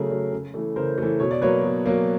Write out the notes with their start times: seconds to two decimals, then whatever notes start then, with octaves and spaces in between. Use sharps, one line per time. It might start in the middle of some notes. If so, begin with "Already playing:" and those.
Already playing: C#3 F#3 A3 G#4 A#4
0.10 F#3 A3
0.32 C#3
0.54 E3 A3
0.76 C#3 A#4 C5
0.98 E3 A3
1.20 B2 C#5
1.31 D5
1.41 F#3 A#3 B4 C#5
1.64 B2
1.86 F#3 A#3